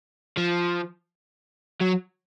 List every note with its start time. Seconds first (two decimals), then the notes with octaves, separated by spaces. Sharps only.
0.37 F3
1.81 F#3